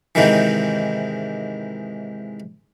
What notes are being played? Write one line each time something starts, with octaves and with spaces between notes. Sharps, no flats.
G#2 C3 D#3 E3